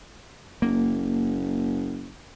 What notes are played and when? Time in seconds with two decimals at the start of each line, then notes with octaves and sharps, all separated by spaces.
0.62 F#1 A#3